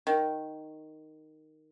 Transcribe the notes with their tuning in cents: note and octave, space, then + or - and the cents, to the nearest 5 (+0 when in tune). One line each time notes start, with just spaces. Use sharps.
D#3 -5